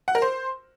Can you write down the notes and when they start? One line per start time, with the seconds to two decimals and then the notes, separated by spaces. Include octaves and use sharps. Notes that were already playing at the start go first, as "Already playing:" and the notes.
0.08 F#5
0.15 A#4
0.22 C5